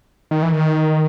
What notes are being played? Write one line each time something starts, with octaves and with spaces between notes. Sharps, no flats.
D#3
E3
D#3